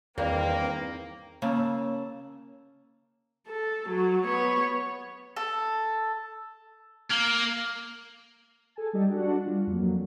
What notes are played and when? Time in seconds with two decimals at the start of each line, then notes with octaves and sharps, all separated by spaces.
0.18 E2 G2 D#3 A#3 C4
1.42 C#3 A#3 A5 E6
3.47 A4
3.89 F#3
4.24 B3 C#5
5.36 A4
7.10 A#3
8.76 G#4 A4 G#5 A5
8.93 G3 D#4 G4 A4 D#5
9.09 D4 F#4 F#5
9.46 G3 F4
9.67 F2 F#3 A#3